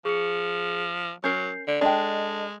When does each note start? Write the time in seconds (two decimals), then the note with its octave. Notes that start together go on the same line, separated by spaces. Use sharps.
0.05 F3 G#4 C#7
1.24 F#3 C#4 A#4 G6 C7
1.68 D3 D5
1.81 G#3 D4 A4 D#5 G5 A5